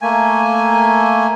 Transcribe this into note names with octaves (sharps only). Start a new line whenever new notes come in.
A3 A#3 G#5